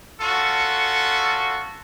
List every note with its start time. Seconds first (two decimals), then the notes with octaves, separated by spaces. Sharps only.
0.20 C#4 F4 F#4 A4